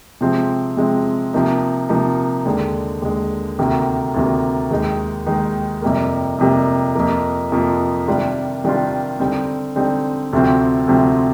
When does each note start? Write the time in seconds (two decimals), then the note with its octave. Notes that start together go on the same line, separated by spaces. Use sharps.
0.21 C3 F3 G#3 C4
0.77 C3 F3 G#3 C4
1.34 C3 F3 A#3 D#4
1.89 C3 F3 A#3 D#4
2.45 D#2 D3 G#3
3.02 D#2 D3 G#3
3.58 D2 C3 D#3 A#3
4.14 D2 C3 D#3 A#3
4.71 D#2 D#3 G#3 D#4
5.27 D#2 D#3 G#3 D#4
5.82 F2 C3 G3 A#3
6.38 F2 C3 G3 A#3
6.95 F2 C3 F3 A#3
7.52 F2 C3 F3 A#3
8.08 C3 D#3 G3 D4 F4
8.64 C3 D#3 G3 D4 F4
9.20 D3 G3 C4 D#4
9.76 D3 G3 C4 D#4
10.33 D2 C3 F3 C4
10.88 D2 C3 F3 C4